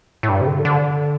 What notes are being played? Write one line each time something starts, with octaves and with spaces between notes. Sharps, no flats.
A2
G2
C3
D3
D3